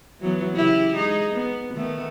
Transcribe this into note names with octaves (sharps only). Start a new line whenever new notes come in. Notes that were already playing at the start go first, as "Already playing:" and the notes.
E3 F#3 B3
C#3 E4 G4
G#3 D#4 G#4
B3
D#3 A3 B3